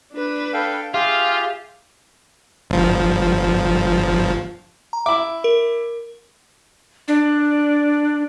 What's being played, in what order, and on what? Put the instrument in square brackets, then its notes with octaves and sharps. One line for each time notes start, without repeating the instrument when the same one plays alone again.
[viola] D4 B4
[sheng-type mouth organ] A4 F5 G5
[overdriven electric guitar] F4 [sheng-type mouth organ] G4 G#4 [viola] E5
[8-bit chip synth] G1 F3
[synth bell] A#5
[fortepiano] E4 D6 [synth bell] E5
[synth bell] A#4
[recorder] D4